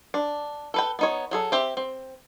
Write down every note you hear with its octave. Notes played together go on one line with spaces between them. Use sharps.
D4
A4 B4 G5
B3 D#4 C#5
F#3 G#4 A4
C4 G4 E5
C4